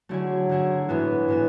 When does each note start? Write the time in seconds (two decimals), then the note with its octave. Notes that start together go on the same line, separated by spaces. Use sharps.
0.09 D3 F#3 A3 E4 G#4
0.49 D3 A3 E4 G#4
0.89 A2 E3 G#3 B3 F#4
1.28 A2 G#3 B3 F#4